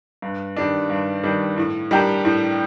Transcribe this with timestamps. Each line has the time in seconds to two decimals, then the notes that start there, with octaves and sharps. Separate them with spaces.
0.22 G2
0.57 D#3 G3 D4
0.90 G2
1.23 D#3 G3 D4
1.58 A2
1.91 G3 D4 G4 A#4
2.25 A2